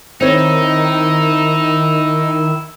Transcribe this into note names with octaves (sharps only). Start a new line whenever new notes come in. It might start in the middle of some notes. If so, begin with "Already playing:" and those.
D#3 C4 D#4 E4 C#5